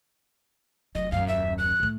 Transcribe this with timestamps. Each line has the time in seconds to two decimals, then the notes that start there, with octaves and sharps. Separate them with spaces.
0.95 F1 F#3 D#5
1.12 D#1 F#2 F5
1.28 E5
1.58 F#6
1.80 A2 A3